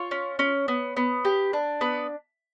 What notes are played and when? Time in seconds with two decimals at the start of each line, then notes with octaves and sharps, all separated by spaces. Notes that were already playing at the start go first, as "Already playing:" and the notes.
Already playing: F4 C#5
0.11 C#4
0.39 C#4
0.68 B3
0.97 B3
1.25 G4
1.53 D4
1.81 B3 B4